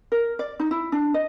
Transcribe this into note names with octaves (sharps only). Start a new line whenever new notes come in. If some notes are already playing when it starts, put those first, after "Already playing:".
A#4
D5
D#4
E4
D4
D#5